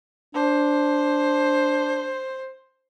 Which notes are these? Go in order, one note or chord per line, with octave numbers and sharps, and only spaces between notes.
D4 C5